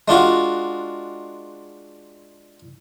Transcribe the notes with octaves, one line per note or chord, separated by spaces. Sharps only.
G#3 D4 F4 F#4